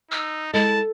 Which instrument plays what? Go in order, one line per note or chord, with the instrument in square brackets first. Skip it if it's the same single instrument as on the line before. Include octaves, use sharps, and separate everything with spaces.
[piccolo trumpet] D#4 [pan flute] E6
[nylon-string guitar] G#3 D#5 [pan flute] E4 [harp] A4 [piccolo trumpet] A5